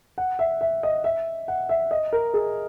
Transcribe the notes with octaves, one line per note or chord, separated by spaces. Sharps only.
F#5
E5
E5
D#5
E5
F#5
E5
D#5
A#4
G#4